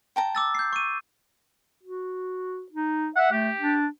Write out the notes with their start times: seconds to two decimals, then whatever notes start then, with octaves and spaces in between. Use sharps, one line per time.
0.16 G5 A5 A#5
0.35 D6 E6 A6
0.55 G6 C7
0.73 C#6 D#7
1.83 F#4
2.72 D#4
3.16 E5 F#5
3.32 A3 G4
3.60 D4